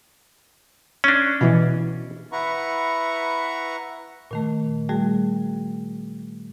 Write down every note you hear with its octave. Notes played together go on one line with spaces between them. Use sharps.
C#4 D4
B2 E3
E4 B4 F#5 A#5 C#6
A#2 D#3 A3
G3 A3 F#4 G#4